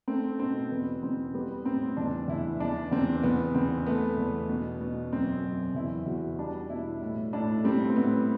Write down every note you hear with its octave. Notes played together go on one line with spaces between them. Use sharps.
A3 C4
B2 C4
E2 B3
E2 C4
G3 B3
A2 C4
E2 D4
E2 E4
E2 D4
E2 C4
E2 B3
E2 C4
A3 B3
E2
B2
B2
F#2 C4
F#2
E2 E4
E2 F#4
G3 D4
B2 E4
A2
A2 D4
G3 C4
C4
A2 B3